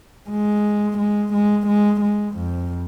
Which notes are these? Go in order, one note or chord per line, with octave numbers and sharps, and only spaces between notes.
G#3
G#3
G#3
G#3
G#3
F2